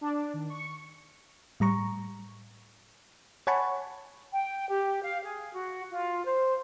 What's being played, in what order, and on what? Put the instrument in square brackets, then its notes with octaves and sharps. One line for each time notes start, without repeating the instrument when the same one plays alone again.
[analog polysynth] D4
D#3
C#6
[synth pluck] A2 G3 A#5 C#6
C#5 F#5 G#5 A5 B5 C#6
[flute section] G5
G4
F5
G#4
F#4
F4
C5